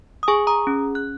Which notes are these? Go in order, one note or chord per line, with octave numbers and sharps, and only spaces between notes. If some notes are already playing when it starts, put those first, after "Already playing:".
D#6
G#4 G#5 C#6
A#5 D#6
C#4
F#6